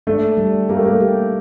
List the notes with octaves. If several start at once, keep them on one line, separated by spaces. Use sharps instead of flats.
A3 D4
G3
A#3 G4
A3
A#3
G4